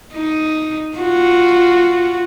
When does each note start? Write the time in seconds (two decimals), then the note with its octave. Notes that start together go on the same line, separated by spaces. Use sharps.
0.15 D#4
0.97 F4 F#4